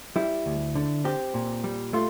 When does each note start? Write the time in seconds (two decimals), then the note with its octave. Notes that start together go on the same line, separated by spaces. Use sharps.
0.16 G3 E4
0.46 D2
0.75 D3
1.04 C4 G4
1.34 A#2
1.64 G3
1.93 A3 F4